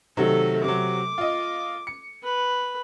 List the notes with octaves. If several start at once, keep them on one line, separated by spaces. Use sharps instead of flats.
C3 D#3 F#3 A3 A4
C3 F#3 D6
F4 D#5
C#7
B4